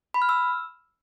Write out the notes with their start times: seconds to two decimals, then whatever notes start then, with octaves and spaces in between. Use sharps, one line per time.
0.14 B5
0.22 F6
0.29 E6